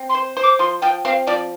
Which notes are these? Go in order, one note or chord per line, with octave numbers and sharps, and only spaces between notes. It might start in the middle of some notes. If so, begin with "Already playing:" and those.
Already playing: C4
C6
C5
C5
D6
F3 C6
F3 G5
C4 F5
F3 D5